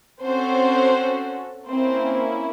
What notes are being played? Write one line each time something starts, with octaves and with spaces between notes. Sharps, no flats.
C4 C#4 F#4 A4 C5
A#3 C4 C#4 E4 C5